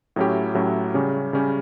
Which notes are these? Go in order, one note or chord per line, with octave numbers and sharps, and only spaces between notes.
A2 F#3 C#4 E4 G4
A2 F#3 C#4 E4 G4
C#3 G3 C#4 G4
C#3 G3 C#4 G4